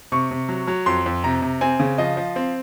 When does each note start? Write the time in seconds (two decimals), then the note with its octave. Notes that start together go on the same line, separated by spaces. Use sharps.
0.12 C3 C#6
0.31 C3
0.49 F#3
0.67 F#3
0.86 F2 C6
1.06 F2
1.24 C3 A#5
1.42 C3
1.61 C4 G#5
1.80 C#3
1.98 F3 D#5
2.17 F3
2.36 C4